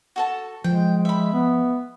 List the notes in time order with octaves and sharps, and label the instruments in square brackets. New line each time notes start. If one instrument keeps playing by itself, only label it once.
[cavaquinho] F#4 A4 A5
[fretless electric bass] F3 [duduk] G#3 [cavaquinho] G5
[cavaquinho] E5 B5
[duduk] B3